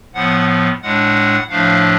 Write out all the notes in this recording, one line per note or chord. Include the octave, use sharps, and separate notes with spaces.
A2 F3 B3 F#5
A2 G#3 D4 F#5
A2 F3 A3 D4 F5